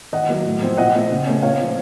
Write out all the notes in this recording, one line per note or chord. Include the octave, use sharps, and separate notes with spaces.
D#3 D#5 F#5
F#3 A#3
A2
F3 C4
A#2 D#5 F#5
A3 C4
C#3
A3 C#4
A#2 C#5 F5
F3 C4